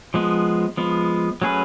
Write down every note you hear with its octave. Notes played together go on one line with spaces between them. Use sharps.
F3 G#3 B3
F3 G#3 B3
F#3 A3 C#4 G#4 B4